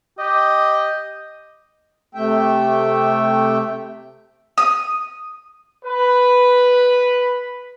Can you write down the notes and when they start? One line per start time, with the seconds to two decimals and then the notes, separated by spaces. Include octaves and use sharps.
0.19 G4 D#5
2.15 C3 A3 E5 G5
4.58 D#6
5.85 B4 B5